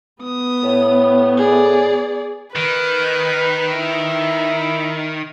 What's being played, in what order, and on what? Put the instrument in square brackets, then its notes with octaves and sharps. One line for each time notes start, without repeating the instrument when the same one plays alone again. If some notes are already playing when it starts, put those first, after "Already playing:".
[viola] B3 [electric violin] D#6
[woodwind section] A2
[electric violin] G#4 D5
[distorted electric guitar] D#3 [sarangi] B4
[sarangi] E4